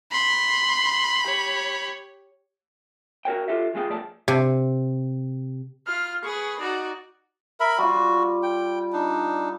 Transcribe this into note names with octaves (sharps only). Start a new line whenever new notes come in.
B5 C6
G4 C#5
F#4 A#4 C#5 G5
F4 G4 A4 E5
E2 G#3 D4 F4 G#4 G5
B1 F2 F3 A3 D5 A5
C3
F4 F6
G#4 B4 C#6
D#4 F#4 D5
A#4 E5 B5
G3 F4 F#4
G5
D4 D#4